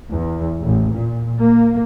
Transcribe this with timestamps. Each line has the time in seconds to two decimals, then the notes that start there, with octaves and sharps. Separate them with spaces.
0.10 E2
0.59 A1
0.91 A#2
1.40 A#3